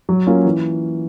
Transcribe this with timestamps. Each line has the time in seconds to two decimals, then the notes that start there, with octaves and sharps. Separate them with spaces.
0.09 F#3
0.27 A#3 C#4 F4
0.45 E3